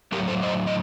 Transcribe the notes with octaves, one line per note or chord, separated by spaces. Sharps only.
A2 F#3 G4 A#4
A4 C5
C5 D#5
D#5